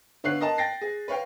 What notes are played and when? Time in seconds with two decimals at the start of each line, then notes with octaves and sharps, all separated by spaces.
0.24 D3 B3 C#5 F5 F#6 C7
0.41 A#4 D#5 A5
0.58 G5 A6 A#6 C7
0.81 G#4
1.08 B4 C#5 F5 G5